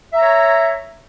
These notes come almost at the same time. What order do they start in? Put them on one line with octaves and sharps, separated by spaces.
E5 A#5 C#5